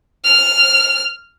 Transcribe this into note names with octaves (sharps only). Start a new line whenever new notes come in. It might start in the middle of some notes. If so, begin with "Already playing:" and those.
F6